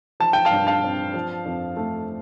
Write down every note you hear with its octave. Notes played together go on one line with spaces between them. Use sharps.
F3 A5
G5
F5 A5
G2
F5 A5
C4
F3
F2
A3